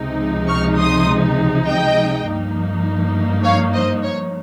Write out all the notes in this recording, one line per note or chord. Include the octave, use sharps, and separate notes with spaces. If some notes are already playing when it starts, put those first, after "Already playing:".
Already playing: C#2 C3 F3 G#3 D#4
C#6 F6
C6 D#6
D#5 G5
G2 F3 A#3 D#4
C#5 F5
C5 D#5
C#5